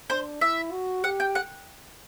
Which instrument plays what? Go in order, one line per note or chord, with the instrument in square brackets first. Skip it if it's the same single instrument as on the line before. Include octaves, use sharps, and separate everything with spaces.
[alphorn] D4 [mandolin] C5
[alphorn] E4 [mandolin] E5
[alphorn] F#4
[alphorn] G4 [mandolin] F#5
[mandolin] G5
F#5